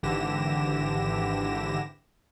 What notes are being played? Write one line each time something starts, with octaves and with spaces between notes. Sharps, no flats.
G#1 D3 E3 G4 A#6 E7